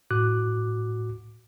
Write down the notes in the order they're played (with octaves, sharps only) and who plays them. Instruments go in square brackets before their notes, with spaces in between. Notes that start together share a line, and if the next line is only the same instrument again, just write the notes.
[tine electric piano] A2 F#4 D6 F#6